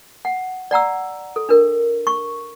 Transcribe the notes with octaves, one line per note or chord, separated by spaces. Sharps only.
F#5
D5 F#5 A#5 E6
A4
D4 A#4
C#6